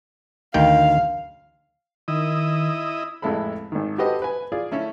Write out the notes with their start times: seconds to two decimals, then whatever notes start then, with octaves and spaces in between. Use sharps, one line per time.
0.54 D2 D#3 F5 G5
2.08 D#3 E4 D#5
3.22 A1 F2 G#3 E4 A4 B5
3.72 G#1 D#3
3.98 F#4 G4 A4 B4 C5 D#5
4.22 B4 G#5
4.52 F4 G#4 D5
4.72 A3 C#4 E4 E5